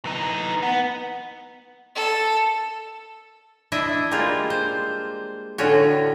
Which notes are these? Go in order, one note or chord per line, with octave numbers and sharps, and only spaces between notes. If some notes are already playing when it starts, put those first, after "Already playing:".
E3 D#4
B3
A4
D4 E4 D#5 E5
G3 G#3 A#3 F4
C5
A2 D3 C#4 F4 F#4